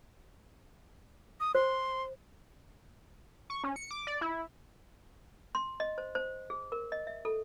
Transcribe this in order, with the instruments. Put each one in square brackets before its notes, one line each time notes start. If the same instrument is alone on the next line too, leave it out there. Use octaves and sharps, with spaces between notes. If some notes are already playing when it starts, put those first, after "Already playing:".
[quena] D#6
[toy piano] C5 [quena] C6
[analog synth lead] C#6
C#4
C#7
D6
D5
E4
[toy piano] C6
D#5
C5
C5
G#4
A#4
D#5
E5
A4